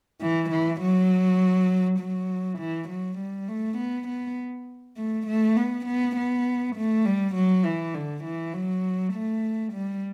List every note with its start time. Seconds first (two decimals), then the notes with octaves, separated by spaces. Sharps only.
0.21 E3
0.50 E3
0.81 F#3
1.99 F#3
2.59 E3
2.89 F#3
3.18 G3
3.48 A3
3.78 B3
4.08 B3
4.97 A3
5.27 A3
5.57 B3
5.86 B3
6.16 B3
6.76 A3
7.05 G3
7.35 F#3
7.65 E3
7.94 D3
8.24 E3
8.54 F#3
9.13 A3
9.73 G3